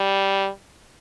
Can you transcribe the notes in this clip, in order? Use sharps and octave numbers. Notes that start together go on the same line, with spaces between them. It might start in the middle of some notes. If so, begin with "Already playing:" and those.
Already playing: G3